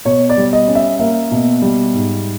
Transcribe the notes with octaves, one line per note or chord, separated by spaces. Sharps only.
B2 C#5
D5
G3
D#5
C#4
E5
A#3 E5
B2
G3
G#2